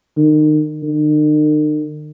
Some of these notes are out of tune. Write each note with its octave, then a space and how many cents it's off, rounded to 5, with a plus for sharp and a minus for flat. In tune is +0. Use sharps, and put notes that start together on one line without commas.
D#3 -30
D#3 -45